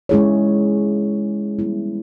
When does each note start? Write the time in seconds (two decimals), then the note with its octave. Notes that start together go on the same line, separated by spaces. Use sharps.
0.09 G#3 C#4 E4 G#4 C#5
1.59 G3 B3 E4